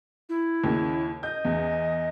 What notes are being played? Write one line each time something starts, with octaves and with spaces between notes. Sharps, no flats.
E4
D#2 C#3
D#5 G6
E2